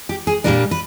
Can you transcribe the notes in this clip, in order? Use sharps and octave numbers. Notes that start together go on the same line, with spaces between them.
G4
G#4
A#2 G3 A#3 D4 A#4
B4